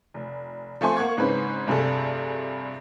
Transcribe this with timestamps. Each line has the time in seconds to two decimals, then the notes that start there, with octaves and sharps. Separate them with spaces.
0.14 F1
0.81 F3 A3 C4 G#5 C6 C#6
0.97 A#3 F#5 C#6 G#6
1.17 F#1 G#2 C4 C#4 B4
1.67 F1 G2 C3 G#4 A4